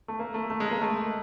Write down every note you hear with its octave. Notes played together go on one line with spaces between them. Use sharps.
A3
A#3
A3
A3
G#3
A#3
A3